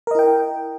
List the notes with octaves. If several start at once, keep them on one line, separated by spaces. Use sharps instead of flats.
E4 A#4 D#5 G5